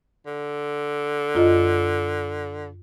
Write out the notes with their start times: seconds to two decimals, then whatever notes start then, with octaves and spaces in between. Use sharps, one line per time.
0.27 D3
1.35 F#2 F4 D#5